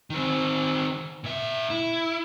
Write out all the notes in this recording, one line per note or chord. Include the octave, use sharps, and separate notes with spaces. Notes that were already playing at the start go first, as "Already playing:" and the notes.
D#3 C4
A#2 E5
E4